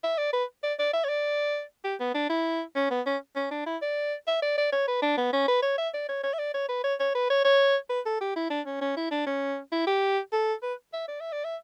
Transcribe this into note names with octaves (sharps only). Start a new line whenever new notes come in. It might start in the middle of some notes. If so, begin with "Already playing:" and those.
E5
D5
B4
D5
D5
E5
C#5
D5
G4
B3
D4
E4
C#4
B3
C#4
C#4
D4
E4
D5
E5
D5
D5
C#5
B4
D4
B3
C#4
B4
C#5
E5
D5
C#5
C#5
E5
D5
C#5
B4
C#5
C#5
B4
C#5
C#5
B4
A4
G4
E4
D4
C#4
C#4
E4
D4
C#4
E4
G4
A4
B4
E5
D5
E5
D5
E5